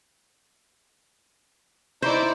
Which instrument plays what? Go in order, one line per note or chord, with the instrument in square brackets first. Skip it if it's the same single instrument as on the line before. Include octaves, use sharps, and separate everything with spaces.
[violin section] D#4 E4 D5 [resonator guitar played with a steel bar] C5